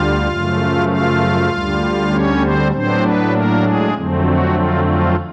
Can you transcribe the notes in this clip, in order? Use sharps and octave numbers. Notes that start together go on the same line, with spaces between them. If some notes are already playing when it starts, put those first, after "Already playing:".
Already playing: D2 D3 G3 F4 F5
F#2 C#3 F3 A3
F4 F5
D2 D3 G3
C#4 C#5
C4 C5
A2 F#3 B3 C4 D4 C5
B3 B4
A#3 A#4
G#3 G#4
F2 D3 F#3 A3 C4
F#4
F4
F4